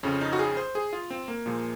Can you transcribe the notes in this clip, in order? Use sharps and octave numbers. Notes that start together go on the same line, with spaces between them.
F2 C#3 F3 C#4
D#4
F#4
G#4
C5
G#4
F4
C4
A#3
A#2 F3 G#3